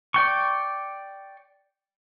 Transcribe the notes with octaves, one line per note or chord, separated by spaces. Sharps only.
D5 G5 C#6